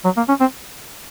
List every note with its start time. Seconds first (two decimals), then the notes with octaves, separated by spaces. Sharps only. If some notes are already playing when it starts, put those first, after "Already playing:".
0.04 F#3
0.17 A#3
0.28 C#4
0.40 C4